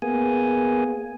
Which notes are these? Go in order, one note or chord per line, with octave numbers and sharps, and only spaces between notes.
A#3 B3 G#4 G#5